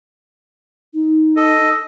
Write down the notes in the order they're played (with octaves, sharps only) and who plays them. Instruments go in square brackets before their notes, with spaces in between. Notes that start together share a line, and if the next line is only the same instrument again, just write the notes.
[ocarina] D#4
[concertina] A4 D#5